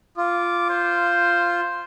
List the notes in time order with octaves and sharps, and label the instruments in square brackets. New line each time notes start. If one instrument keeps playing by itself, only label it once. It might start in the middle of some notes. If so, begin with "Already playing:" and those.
[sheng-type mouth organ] F4 [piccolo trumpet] D6
[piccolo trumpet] C5